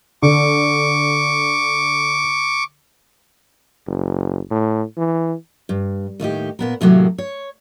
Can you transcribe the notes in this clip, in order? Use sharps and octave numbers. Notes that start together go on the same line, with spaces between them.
D3 C#6 D6
F#1
A2
E3
G2
D#2 A2 D#4 G4
A#2 B3 A#4
D#2 A2 C3 F#3 A#3 F#4
C#5